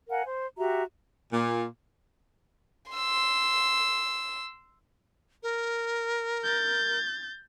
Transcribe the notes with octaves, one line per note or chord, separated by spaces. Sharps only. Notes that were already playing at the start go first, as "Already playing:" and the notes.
A#4 F5 F#5 G#5
C5
F#4 G4 E5 A#5
A#2
C6 E6
A#4
G6 A6